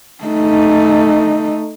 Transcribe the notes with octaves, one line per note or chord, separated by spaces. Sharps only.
A3 D#4